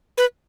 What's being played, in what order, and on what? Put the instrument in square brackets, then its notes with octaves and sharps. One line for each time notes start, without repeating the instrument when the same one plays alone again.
[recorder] B4